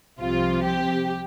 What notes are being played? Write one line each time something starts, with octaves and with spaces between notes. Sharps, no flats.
C2 C3 F3 C4 F4
G4